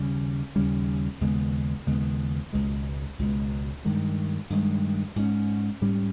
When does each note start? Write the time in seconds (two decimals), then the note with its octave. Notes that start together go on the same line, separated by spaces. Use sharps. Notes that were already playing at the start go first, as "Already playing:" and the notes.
Already playing: D#2 C#3 G3 C#4
0.56 D#2 C#3 G3 C#4
1.21 D#2 C#3 G#3 B3
1.86 D#2 C#3 G#3 B3
2.53 C#2 B2 G#3
3.19 C#2 B2 G#3
3.85 G2 D#3 G#3
4.50 G2 D#3 G#3
5.16 G#2 G3 C#4
5.81 G#2 G3 C#4